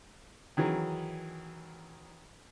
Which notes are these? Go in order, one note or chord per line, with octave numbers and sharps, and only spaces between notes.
D#3 E3 F#3 G#4